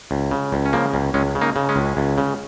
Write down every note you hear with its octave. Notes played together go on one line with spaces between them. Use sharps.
C#2
C#3
C#2
C#4
C#3 F3 A#3
C#2
C#2 G#3 C#4
C#3
A#3 D#4
C#3
G#3 C#4
C#2
C#2
C#3